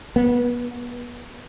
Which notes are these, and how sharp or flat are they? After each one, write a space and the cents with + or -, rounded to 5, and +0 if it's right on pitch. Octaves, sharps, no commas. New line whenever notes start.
B3 -30